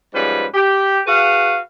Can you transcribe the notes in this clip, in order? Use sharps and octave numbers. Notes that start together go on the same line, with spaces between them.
G#2 F3 G3 C#4 B4
G4
F#4 G#4 B4 F5